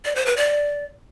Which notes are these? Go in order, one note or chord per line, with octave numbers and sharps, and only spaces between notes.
D5
C5
B4
D5